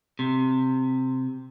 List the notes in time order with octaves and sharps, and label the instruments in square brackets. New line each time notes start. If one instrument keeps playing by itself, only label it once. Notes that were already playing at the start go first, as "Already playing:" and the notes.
[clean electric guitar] C3